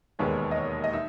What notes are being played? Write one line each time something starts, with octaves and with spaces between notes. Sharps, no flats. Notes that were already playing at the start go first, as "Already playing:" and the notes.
E1 D#2 D#3 G#3 B3 C#5
D#5
C#5
D#5
D#4 E5